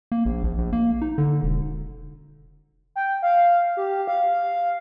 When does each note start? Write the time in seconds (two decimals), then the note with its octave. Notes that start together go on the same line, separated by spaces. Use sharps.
0.12 A#3
0.25 A#1
0.44 A#1
0.58 A#1
0.73 A#3
1.02 D#4
1.18 D3
1.43 E1
2.96 G5
3.22 F5
3.77 G4
4.08 F5